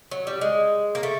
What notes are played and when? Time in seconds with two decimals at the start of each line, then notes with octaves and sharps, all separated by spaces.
0.11 F#3
0.27 G3
0.41 G#3
0.95 A#3
1.03 A3